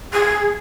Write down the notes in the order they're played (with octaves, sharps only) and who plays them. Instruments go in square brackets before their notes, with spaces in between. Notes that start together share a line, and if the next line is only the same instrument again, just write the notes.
[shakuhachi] G#4